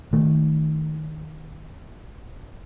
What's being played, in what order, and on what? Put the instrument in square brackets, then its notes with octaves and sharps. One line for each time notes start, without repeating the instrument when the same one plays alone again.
[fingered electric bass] D#3 A3